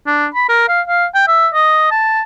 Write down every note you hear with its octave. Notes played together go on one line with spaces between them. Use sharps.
D4
B5
A#4
F5
F5
G5
E5
D#5
A5